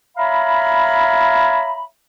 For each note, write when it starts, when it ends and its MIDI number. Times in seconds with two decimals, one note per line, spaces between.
0.17 1.84 73
0.17 1.84 76
0.17 1.84 77
0.17 1.84 82
0.17 1.84 83